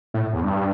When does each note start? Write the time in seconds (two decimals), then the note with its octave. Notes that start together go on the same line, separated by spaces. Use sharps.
0.14 A2
0.33 E2
0.44 G2